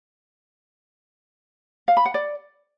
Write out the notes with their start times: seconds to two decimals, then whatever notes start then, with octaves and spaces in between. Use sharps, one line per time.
1.88 F5
1.97 B5
2.05 F#5
2.14 D5